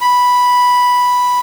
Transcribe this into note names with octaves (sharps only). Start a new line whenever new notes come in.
B5